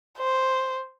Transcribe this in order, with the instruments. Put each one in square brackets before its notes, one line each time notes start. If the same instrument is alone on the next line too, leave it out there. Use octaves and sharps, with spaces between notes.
[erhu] C5